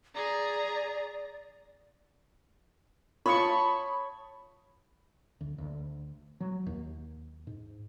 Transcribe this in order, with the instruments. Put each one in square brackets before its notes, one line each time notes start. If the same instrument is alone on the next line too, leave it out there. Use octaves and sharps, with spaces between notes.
[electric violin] G#4 A#5 [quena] D5
[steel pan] F4 C#6 [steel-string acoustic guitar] C#5 [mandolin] A5 [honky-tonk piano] B5 D#6
[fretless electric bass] D2
D2
F#3
D#2
G#2